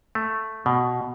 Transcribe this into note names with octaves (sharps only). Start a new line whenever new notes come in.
A3
B2